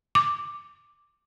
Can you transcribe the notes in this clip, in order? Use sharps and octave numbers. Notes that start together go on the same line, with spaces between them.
D6